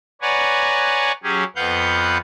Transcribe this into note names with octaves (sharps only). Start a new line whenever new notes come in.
B4 C#5 D5 F#5 G#5 A#5
F#3 C#4 G4 G#4
F2 B3 B4 F5 F#5 G6